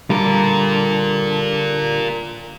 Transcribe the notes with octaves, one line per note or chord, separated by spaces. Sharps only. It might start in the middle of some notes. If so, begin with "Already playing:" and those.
D3 G3 F4 A#4